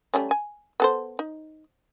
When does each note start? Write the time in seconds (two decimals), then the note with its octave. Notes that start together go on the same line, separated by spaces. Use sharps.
0.14 G3 A3 C#4
0.31 G#5
0.80 B3 A4 C5
1.19 D#4